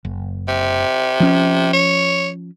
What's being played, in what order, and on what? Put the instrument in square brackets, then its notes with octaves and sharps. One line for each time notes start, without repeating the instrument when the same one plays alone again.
[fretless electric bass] F#1
[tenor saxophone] C3
[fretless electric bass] F3 C#4
[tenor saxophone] C#5